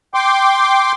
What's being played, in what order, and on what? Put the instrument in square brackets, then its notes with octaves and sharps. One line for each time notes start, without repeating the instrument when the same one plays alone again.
[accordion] G5 C6 D6